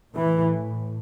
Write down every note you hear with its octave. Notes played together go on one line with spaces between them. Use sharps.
A2 E3